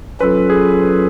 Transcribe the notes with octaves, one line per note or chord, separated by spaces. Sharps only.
F#3 C#4 F4 A4 B4
G#4